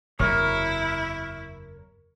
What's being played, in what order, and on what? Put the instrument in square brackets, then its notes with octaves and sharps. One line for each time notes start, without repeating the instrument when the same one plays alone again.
[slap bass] F#1 E2 C3 [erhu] E4 [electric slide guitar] A#4 C#5